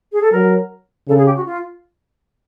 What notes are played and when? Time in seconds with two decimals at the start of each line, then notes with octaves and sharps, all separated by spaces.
0.13 G#4
0.22 A4
0.32 F#3 A#4
1.08 C#3 A4
1.17 G#4
1.26 G4
1.36 F#4
1.46 F4